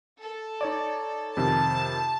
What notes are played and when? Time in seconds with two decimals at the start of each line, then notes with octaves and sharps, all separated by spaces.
0.21 A4
0.61 D#4 C#5 D5
1.37 F2 C3 D#3 A5